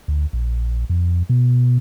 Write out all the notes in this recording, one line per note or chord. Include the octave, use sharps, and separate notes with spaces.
D2
A#1
F2
B2